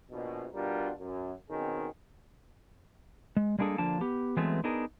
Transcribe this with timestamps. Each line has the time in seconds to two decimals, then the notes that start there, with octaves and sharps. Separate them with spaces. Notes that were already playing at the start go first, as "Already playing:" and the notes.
0.11 A#1 B2
0.54 B2 G3 D4 F4 A#4
0.98 F#2
1.50 B2 D#3 C4 C#4 G#4
3.37 G#3
3.59 G3 G#3 A#3 D4 G#4 A4
3.78 D3 F3 A#3 D4 A5
4.01 B3 G4
4.37 E3 F#3 G#3 A3 B3 C4
4.64 B3 D4 D#4 G#4 A#4